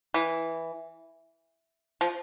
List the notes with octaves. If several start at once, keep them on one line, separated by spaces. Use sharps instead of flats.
E3
F3